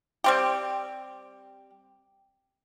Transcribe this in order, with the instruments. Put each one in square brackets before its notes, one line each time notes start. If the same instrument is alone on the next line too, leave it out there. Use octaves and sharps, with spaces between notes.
[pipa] G3 C4 G4